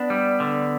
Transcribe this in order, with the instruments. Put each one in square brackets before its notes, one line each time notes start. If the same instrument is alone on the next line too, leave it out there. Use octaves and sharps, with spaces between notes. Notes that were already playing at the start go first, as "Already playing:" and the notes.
Already playing: [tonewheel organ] B3 [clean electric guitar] D4
[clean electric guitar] G3
D3